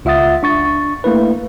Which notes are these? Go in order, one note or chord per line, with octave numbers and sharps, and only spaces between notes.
C#2 F4 E5 F#5 D#6 A6
D4 C#6 A6
A3 A#3 E4 B4